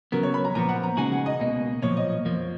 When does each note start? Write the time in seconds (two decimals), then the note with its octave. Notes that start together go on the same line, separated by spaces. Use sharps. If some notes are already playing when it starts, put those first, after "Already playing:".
0.12 C#3 F#3 B3 A#4
0.23 C#5
0.34 B5
0.45 A#5
0.55 A#2 F3 B3 A#5
0.69 F#5
0.83 A#5
0.97 C#3 G#3 D#4 F#4 G#5
1.12 F#5
1.26 D#5
1.40 C#2 B2 A#3 D#5
1.82 B1 A#2 F3 C#5
1.97 D#5
2.25 F2 F3 A#3